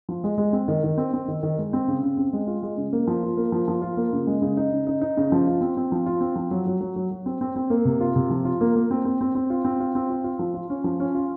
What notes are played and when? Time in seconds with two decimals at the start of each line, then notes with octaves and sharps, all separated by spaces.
0.09 F3
0.24 G#3
0.38 G#3
0.53 C4
0.68 D#3
0.84 D#3
0.98 C4
1.13 C4
1.28 D#3
1.43 D#3
1.58 G#3
1.73 C4
1.88 C#3
2.03 C#3
2.17 C4
2.33 G#3
2.47 F4
2.63 G#3
2.77 C#3
2.93 A#3
3.07 F3
3.23 F4
3.37 A#3
3.52 F3
3.68 F3
3.82 F4
3.97 A#3
4.13 C#3
4.27 G#3
4.42 C#3
4.57 D#4
4.71 C#3
4.87 D#4
5.01 D#4
5.17 C#3
5.32 F3
5.47 F4
5.61 C4
5.77 C4
5.92 F3
6.06 F4
6.21 C4
6.36 F3
6.51 F#3
6.67 F#3
6.81 F#3
6.96 F#3
7.11 F#3
7.26 C4
7.41 C4
7.56 C4
7.70 A#3
7.85 C3
8.01 F4
8.16 C3
8.31 F3
8.45 F4
8.61 A#3
8.76 A#3
8.91 C4
9.05 C4
9.21 C4
9.35 C4
9.50 F4
9.64 C4
9.80 F4
9.95 C4
10.10 F4
10.24 F4
10.39 F3
10.54 F4
10.70 C#4
10.84 F3
11.00 C#4
11.15 F4